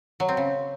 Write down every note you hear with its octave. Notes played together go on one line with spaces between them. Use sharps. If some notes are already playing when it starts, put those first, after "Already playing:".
F#3
C4
C#3